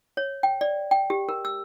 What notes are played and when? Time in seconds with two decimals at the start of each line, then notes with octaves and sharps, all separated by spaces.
0.17 C#5
0.43 G5
0.61 D5
0.91 G5
1.10 G4
1.29 A#4
1.45 E6